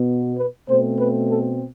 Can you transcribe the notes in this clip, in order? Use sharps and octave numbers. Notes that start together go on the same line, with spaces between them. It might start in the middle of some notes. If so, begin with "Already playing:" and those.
Already playing: B2 B3
B4
B2 A3 C4 C5
B4
A4